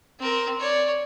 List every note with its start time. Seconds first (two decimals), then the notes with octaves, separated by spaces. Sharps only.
0.20 C4 A#4
0.60 C#5 D5